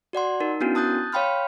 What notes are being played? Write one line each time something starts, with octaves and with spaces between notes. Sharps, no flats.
F#4 D5 F#5 C6
D#4 A#4
B3 C#4 D4 E4 F#4 A#4
A5 D#6 F#6 G6 A6
C#5 F5 G5 B5 C6 F6